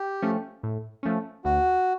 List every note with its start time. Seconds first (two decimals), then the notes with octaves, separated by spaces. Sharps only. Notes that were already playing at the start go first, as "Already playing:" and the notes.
Already playing: G4
0.22 F3 A3 C#4
0.63 A2
1.03 F3 A3 C#4
1.44 D2 F#4